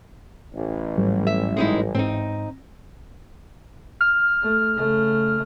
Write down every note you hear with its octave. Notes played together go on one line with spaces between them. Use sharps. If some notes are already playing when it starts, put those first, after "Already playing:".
A1
G#2 F#3 G3
E5
G#3 D#4 E4
G#2 C4 D#4
F6
A3
C#3 A3